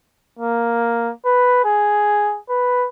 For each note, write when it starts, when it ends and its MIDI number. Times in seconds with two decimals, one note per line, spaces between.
0.39 1.11 58
1.25 1.64 71
1.64 2.39 68
2.49 2.87 71